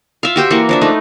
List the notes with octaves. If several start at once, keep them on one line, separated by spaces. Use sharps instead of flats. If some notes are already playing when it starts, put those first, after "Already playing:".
F4 E5 F5
F#4 G4 C5 G5
E3 A#3 F#4 C#6
F3 D4 E5
A3 D#4 B4